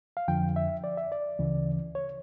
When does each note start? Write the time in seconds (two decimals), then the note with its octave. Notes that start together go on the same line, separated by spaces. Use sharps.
0.17 F5
0.28 F2 D3 F3 G5
0.56 E5
0.84 D5
0.97 E5
1.12 D5
1.39 D2 C#3 E3
1.95 C#5